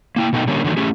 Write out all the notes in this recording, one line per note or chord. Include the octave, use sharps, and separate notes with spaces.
A#3 E4 G5
B2 A3 B3 D#4 G5
D3 G3 A#3 C#4
D3 D#3 F#3 A3
A3 C#4 E4 G4 G#4